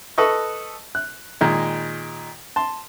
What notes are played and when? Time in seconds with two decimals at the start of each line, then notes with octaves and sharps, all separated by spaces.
0.18 A4 B4 D#5 C#6
0.95 F#6
1.41 A#2 D#3 G#3
2.56 A5 C6